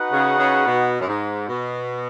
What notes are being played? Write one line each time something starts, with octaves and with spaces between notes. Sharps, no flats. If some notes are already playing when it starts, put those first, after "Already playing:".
Already playing: D#4 F#4 B4 F#5
C#3
C#3
B2
F#2
G#2
B2